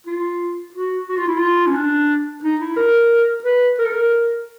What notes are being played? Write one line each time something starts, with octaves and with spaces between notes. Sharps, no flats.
F4
F#4
F#4
F4
E4
F4
C#4
D4
D#4
E4
A#4
B4
A#4
A4
A#4